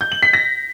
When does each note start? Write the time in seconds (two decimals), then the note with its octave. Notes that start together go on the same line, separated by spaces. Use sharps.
0.01 G6
0.12 F#7
0.23 B6
0.33 A#6